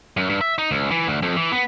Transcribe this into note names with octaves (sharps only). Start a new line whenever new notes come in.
F#2
G2
E5
D#4
C#2
E3
D2
F2
E3
B3